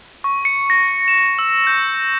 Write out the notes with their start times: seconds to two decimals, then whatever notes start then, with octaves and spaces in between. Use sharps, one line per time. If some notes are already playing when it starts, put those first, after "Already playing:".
0.24 C#6
0.45 C#7
0.70 A#6
1.08 E7
1.39 E6
1.67 G6